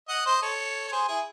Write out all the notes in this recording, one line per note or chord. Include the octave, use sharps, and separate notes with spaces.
D#5 F#5
C5 D#5
A4 C#5
C#5
G#4 C5
E4 G#4